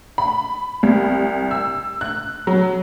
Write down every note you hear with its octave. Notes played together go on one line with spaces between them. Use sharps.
B5
C2
E6
F#6
F#3